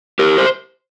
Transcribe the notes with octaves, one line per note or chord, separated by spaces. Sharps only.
G4 A#4
C5